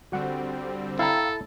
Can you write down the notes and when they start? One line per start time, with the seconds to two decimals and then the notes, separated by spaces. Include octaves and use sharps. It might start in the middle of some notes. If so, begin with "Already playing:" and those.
0.12 D3 G3 C4 F#4 F#5
0.99 E4 A4 F5 G5 A#5